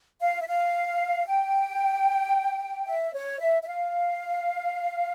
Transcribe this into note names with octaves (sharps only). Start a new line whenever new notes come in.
F5
E5
F5
G5
E5
C#5
E5
E5
F5